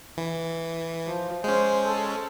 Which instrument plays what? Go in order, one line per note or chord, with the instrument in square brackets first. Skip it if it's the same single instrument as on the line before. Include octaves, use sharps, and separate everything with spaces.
[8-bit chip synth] E3
[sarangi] F3
[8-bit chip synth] G#3 C#4 [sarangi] C5
[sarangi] A4